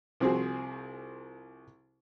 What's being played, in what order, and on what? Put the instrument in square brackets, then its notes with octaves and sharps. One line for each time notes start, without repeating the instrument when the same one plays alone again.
[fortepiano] C2 F3 C4 F#4 G#4